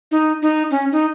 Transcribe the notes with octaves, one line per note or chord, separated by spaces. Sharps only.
D#4
D#4
C#4
D#4